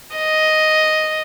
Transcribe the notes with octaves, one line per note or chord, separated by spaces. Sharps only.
D#5